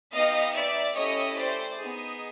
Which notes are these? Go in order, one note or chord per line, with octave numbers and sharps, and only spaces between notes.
B3 D#4 G4 D#5 F5
D5 E5
A3 C#4 E4 G4 C#5 D#5
C5 D5
B3 D#4 G#4